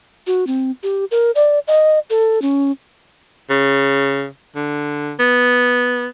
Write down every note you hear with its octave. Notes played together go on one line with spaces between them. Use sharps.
F#4
C4
G4
A#4
D5
D#5
A4
C#4
C#3
D3
B3